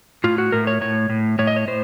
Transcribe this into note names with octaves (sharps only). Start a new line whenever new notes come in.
A2 F4
F#4
A2 A#4
C#5
A2 C#5
A2
A2 C#5
D#5
C#5
A2 C5